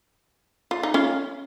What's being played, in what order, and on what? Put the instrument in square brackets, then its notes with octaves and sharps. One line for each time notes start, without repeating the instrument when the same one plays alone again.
[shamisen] F4
D#4
C#4 F4